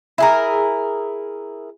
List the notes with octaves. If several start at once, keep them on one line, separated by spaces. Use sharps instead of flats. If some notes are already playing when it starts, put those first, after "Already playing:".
E4 G#4 A#4